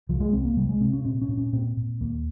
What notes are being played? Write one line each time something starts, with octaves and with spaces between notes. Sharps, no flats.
C2 F3
G#3
C2 C4
A#3
C3 G3
G#3
C3 C4
C#4
A#2 C4
C#4
A#2
C#4
A#2 C4
A#2
D#2 A#3